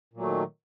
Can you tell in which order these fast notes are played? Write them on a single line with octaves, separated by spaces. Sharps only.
A#2 F#3 A3 D#3